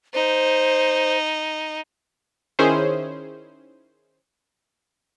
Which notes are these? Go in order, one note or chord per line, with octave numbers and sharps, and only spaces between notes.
D#4 C5
D#3 C#4 E4 G#4 C5